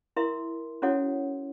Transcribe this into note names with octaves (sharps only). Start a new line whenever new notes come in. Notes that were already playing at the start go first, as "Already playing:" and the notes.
E4 A#4 E5 C6
C#4 E4 F#4 A4 C#5 F#5